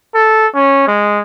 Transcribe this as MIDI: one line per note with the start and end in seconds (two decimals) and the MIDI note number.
0.14 0.47 69
0.55 0.86 61
0.87 1.21 56